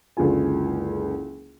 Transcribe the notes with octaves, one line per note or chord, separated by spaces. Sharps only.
F#1 C#2 D3 F4 G#5